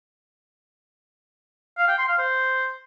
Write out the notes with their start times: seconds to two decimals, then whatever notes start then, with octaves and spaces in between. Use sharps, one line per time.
1.78 F5
1.88 G5
1.98 C6
2.08 F5
2.19 C5